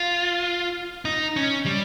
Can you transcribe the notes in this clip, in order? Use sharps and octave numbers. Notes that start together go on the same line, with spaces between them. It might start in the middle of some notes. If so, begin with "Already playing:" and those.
Already playing: F4
D#4
C#4
G3